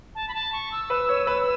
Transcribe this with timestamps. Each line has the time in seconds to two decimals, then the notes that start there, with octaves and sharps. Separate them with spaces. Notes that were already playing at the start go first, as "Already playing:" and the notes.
0.15 A5
0.28 B5
0.34 A5
0.52 C#6
0.71 E6
0.90 B4
1.09 C#5
1.27 B4